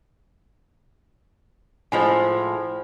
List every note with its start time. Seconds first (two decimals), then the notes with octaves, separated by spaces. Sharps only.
1.92 A2 F3 G#3 C5 G#5